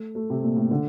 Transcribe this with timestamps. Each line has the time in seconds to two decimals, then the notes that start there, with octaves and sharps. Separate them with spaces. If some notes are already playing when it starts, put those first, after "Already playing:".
Already playing: A3
0.15 A3
0.30 C3
0.43 A#2
0.56 A2
0.71 D3